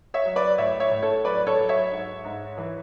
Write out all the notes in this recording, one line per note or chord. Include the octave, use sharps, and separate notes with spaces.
C#5 E5
F#3
B4 D5
A2 C#5 E5
C#5 E5
A2
A4 C#5
F#3 B4 D5
A4 C#5
F#3
C#5 E5
G#2
G#2
E3